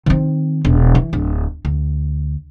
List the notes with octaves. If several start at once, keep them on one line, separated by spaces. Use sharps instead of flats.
D#3 C4
E1
E3
D1
D2